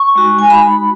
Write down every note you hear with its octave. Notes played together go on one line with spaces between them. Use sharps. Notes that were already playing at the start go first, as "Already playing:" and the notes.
Already playing: C#6
G#3 D#4 F#4
G#5
G#3 D#4 F#4 B5